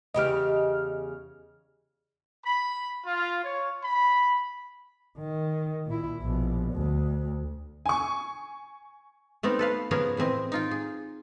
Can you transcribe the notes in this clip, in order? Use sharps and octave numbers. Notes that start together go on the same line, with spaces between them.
E2 C#3 G4 D#5 F6
B5
F4
C#5
B5
D#3
A#2 E4
A#1 B2
D2
G#5 C#6
A3 B3 C4 D#4 A#4
A4 B4 F5
C#3 F3 B3 C#4 G#4 A#4
A2 E3 C4 D#5
D#4 F4 G5
G#4